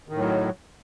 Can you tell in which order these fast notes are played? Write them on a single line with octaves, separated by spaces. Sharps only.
D#3 A2 F#3